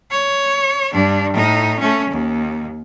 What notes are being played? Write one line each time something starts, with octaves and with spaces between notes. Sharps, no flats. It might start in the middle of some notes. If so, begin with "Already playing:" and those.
C#5
G2 D4
A2 D#4
A3 C#4
D#2